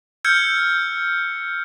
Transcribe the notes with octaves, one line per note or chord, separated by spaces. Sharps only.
E6 F6 G6 G#6 C#7